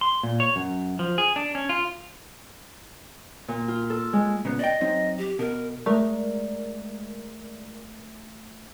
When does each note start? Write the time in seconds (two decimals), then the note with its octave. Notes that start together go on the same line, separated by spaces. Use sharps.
0.01 C6
0.23 A#2
0.40 C#5
0.56 F#2
0.99 F3
1.18 G#4
1.36 D4
1.55 C#4
1.69 F4
3.48 A#2
3.68 F4
3.90 A4
4.13 G#3
4.45 A#2 C#3 B3
4.59 D5 D#5 G5
4.81 F#3 C4 D#4
5.18 G4
5.39 B2 A#4
5.86 G#3 A3 A#4 D5